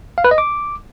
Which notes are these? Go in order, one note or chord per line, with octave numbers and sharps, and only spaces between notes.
F5
B4
D#5
D6